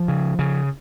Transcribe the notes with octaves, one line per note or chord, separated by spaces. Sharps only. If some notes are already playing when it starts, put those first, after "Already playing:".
Already playing: F3
C#3
C#3